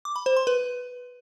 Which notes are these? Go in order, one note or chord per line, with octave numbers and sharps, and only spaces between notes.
D6
B5
C5
C6
B4